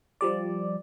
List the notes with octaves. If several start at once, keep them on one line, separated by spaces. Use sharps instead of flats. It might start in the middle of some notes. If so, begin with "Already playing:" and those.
F3 G3 D5